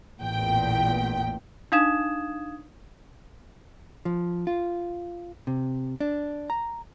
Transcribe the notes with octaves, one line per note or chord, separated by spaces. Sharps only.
A1 E2 A#2 G5
D4 D#4 F5 D#6 G#6 E7
F3
F4
C3
D4
A#5